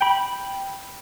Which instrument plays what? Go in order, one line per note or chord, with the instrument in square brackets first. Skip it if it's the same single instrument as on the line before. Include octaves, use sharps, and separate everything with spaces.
[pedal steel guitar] G5 B5